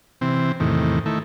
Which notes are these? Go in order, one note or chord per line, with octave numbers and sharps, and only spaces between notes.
C3 E3 C4
E2 A2 C3 D#3
D#3 A3 E4